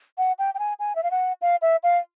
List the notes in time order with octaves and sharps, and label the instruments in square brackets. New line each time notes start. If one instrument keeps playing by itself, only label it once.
[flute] F#5
G5
G5
G#5
G#5
E5
F5
F#5
F5
E5
F5